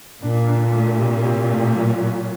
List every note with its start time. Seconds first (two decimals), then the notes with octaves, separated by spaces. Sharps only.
0.22 A#2 D4
0.47 D3
0.72 A3
0.98 C3
1.24 C3
1.49 A3
1.75 F#3
2.00 F#3